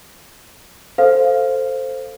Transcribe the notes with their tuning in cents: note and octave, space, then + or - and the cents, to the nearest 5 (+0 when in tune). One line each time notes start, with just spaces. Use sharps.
A4 +10 C5 +0 F5 +0